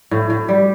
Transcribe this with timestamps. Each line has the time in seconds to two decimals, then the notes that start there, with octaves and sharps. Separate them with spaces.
0.11 A2
0.30 A2
0.48 G3